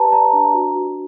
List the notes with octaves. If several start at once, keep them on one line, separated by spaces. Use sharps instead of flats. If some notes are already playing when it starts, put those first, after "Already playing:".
Already playing: G4 B4 D5 A5 A#5
D5 A#5
D4
F#4
F#4